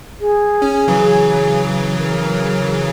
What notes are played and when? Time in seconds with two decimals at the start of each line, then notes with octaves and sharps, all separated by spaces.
0.20 G#4
0.62 C#4
0.88 C#3 E3 F#3
1.98 A#4